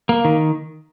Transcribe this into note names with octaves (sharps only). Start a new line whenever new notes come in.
A#3
D#3